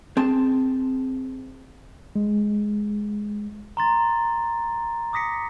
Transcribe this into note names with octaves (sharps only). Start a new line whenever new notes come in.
C4 G#4 A5
G#3
A#5 C6 A6
D6 D#6 A#6 B6 C#7